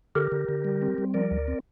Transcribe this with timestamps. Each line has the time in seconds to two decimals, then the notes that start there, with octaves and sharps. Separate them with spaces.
0.15 D3 G4 A#4
0.32 D3
0.49 D3
0.65 G3
0.82 C4
0.98 G3
1.14 F3 A#4 D5
1.31 D2
1.48 C4